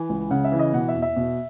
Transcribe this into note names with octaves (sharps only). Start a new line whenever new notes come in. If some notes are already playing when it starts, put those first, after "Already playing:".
Already playing: E3 G#5
C#2
C#3 F#5
E5
E3
D#5
B2 F#5
E5
E2
E5
B2